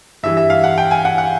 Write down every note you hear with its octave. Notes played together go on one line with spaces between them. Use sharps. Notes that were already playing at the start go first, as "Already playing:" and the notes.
G2 E3 G3 E5
E5
F5
F#5
G5
G#5
F#5
F#5